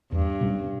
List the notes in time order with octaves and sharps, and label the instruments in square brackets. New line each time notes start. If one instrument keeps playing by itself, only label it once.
[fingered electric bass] E2 [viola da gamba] G2
[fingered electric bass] B2 G3 C#4